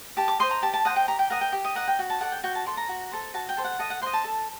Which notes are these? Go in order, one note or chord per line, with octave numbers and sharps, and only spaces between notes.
G4 A5
D6
C5 D#5 C6
A#5
G4 A5
A5
C5 D#5 F#5
G5
G4 A#5
G5
A#4 D#5 F#5
G5
G4
D#5
A#4 D#5 F#5
G5
F#4
A5
A4 D5 F#5
G5
F#4 G5
A5
A4 D5 C6
A#5
F#4
A4 C5
F#4 A5
G5
A4 C5
F#5
A4 D#5
F#5
C5 D#5 C6
A5
A4